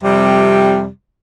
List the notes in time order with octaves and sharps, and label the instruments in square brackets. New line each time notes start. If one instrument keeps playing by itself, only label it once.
[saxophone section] F2 C3 G3